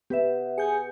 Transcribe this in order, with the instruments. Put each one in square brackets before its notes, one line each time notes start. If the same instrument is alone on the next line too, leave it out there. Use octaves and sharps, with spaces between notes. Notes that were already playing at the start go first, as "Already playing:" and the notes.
[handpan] B3 [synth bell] G4 B4 E5
[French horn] G#4 [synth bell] G#5 G6 C#7